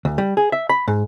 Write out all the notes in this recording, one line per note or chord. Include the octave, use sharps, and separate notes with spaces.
D2
G3
G#4
E5
B5
G#2